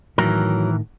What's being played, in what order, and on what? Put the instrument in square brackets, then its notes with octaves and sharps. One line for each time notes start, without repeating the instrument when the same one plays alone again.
[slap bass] A2 D#3 [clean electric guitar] E3 A#4 [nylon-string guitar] F#3